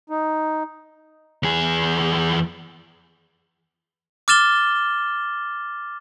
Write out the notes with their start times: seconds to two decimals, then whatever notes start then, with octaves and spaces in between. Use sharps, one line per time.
0.10 D#4
1.43 E2 G#4
4.28 D6 F6 A6 E7 G7